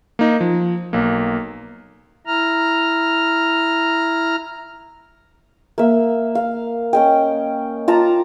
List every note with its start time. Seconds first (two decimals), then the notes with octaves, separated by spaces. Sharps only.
0.19 A#3 D#4
0.41 F3
0.93 B1 A#3
2.26 E4 A#5 F6
5.78 A#3 E5
6.35 F5
6.93 C#4 D#5 G5
7.88 F4 A5 A#5 D6